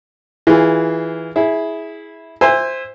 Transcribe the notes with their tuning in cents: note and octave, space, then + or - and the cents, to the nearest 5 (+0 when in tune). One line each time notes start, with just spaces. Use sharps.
E3 -10 F4 -5 G#4 +0
E4 -10 G#4 +5
C5 +0 E5 +0 G#5 -30